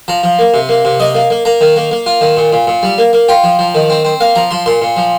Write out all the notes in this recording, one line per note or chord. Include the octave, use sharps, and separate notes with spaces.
F3 A#5
F3
A#3
C3
A#3
C3
A#3 D#5
A#3
A#3
A#3 A#5
D#3
A#3
A#3
F4
D#3
A#2
A#2
A#2
G3
A#3
A#3
F4 G5
F3
F3
D#3
C4
C4
A#3 F5
F3 A#5
F3 C6
A#2 C6
A#2
F3